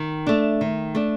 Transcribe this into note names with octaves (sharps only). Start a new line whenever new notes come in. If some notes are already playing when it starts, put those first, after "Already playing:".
Already playing: D#3
A3 D4
D#3
A3 D4